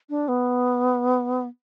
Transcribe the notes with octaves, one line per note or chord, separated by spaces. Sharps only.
D4
B3